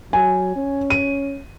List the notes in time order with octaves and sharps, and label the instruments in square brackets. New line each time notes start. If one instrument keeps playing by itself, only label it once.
[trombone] F#3 [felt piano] G#5
[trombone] C#4
[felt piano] D#7